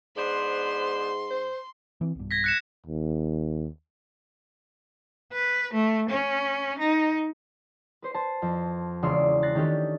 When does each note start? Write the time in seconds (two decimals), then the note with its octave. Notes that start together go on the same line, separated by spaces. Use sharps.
0.16 G#2 B3 D4 C5 C6
1.31 C5
2.01 E3 C4
2.15 B1 G2
2.31 G#6 A#6 B6
2.44 F#6 C#7 E7
2.86 D#2
5.33 B4
5.73 A3
6.10 C#4
6.79 D#4
8.02 B4 C5 C7
8.14 C5 A5
8.42 F2
9.02 E1 C#3 D5 C6 E6 F6
9.42 F#6 A6 A#6 C7
9.55 D#3 A3 C#4 D4 G4 A4